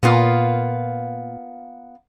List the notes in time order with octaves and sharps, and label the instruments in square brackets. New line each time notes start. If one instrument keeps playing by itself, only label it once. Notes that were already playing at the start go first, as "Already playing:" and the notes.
[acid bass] A#2 [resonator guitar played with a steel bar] A#3 B3 F4